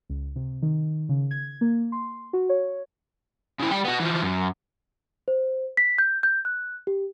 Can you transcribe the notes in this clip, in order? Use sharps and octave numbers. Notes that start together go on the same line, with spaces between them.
C#2
C3
D#3
C#3
G#6
A#3
C6
F#4
C#5
C#3 E4
G3 G5
B3 F#4
E3 F3
F#2
C5
B6
G6
G6
F#6
G4